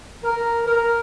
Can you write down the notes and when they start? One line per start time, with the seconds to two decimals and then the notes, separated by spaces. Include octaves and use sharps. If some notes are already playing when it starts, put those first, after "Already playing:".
0.24 A#4
0.67 A#4